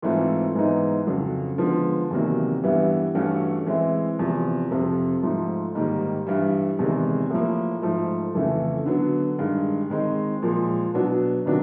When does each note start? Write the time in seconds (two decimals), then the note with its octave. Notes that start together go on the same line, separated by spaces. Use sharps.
0.02 G#2 E3 A3 C4 F4
0.55 G#2 E3 G#3 B3 D#4
1.06 F2 C#3 F#3
1.58 D3 F3 G#3 B3
2.11 E2 C3 D#3 F#3 A#3
2.63 G2 E3 G3 B3 E4
3.15 G2 E3 A3 C#4 F#4
3.66 E3 G#3 C4 E4
4.19 E2 C3 F3
4.71 F2 C3 F3
5.23 G#2 F3 A3
5.75 G#2 D#3 G3 A#3 D#4
6.27 G2 E3 G3
6.79 E2 C3 D#3 G#3
7.30 A2 F3 A#3
7.82 G#2 F3 A3
8.34 F2 C#3 E3 A3
8.86 D3 F#3 B3
9.38 G2 D#3 G#3
9.90 D#3 G#3 C4 D#4
10.42 A#2 F3 G#3
10.94 B2 F#3 B3 D4
11.46 C3 D#3 F#3 B3 D4